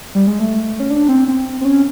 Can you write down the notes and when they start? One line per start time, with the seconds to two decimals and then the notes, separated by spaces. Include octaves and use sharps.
0.15 G3
0.27 G#3
0.40 A3
0.80 C#4
0.90 D4
1.09 C4
1.28 C4
1.61 C4
1.65 C#4